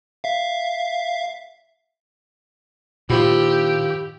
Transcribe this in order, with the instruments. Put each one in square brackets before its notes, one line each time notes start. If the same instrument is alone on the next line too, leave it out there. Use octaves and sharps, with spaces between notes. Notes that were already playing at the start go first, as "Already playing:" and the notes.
[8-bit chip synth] E5 F5
[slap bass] A#2 [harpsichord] D#3 F3 E4 [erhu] G4